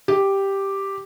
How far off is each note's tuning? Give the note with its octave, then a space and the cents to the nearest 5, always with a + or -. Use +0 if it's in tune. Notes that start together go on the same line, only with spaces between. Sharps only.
G4 +0